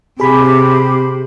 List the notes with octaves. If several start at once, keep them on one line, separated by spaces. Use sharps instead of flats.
C3 G4 G#4 B5